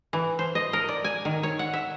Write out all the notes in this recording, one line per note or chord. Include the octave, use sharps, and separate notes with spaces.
E3
C5
D#5
A#4
D5
G#5
D#3
C#5
F#5
E5